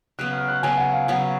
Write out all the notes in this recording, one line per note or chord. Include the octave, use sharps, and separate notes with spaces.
C#3 F#3 B3 F#6
F6
F#6
C#3 F#3 B3 G#5
F#5
F5
C#3 F#3 B3 F#5